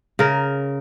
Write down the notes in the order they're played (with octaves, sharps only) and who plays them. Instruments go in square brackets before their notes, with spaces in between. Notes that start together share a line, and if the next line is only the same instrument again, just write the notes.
[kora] C#3 A#4